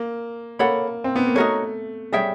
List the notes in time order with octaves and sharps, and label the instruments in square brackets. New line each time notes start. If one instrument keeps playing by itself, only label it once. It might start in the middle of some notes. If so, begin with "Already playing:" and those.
Already playing: [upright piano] A#3
[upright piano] A#3 [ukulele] A4 C#5 F#5 B5
[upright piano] C4
B3
A#3
[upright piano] A3 [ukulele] D#4 F#4 A#4 C#5
[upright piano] G3 [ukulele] G#4 C#5 E5 G5